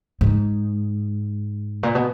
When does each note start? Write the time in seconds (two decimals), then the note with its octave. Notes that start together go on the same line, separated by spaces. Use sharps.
0.21 G#2
1.83 A#2
1.95 B2